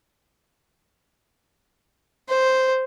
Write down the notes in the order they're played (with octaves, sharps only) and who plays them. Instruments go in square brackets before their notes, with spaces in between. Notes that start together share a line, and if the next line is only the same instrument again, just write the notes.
[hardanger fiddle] C5